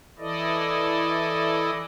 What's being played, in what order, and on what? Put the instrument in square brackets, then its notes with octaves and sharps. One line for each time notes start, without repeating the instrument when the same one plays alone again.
[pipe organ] E3 E4 A4 D5 D#5